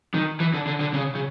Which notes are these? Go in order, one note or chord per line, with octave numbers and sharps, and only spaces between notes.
D#3
E3
D3
D3
D3
C#3
C#3